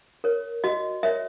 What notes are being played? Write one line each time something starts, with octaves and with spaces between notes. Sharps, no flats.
A#4 C#5
F#4 D#5
A#4 C#5 E5